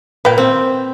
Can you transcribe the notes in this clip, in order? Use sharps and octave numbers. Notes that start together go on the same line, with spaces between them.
A#2 B4 G5
C4